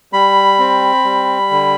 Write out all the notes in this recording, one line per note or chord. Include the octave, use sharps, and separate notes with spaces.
G3 B5
C4
G3
D3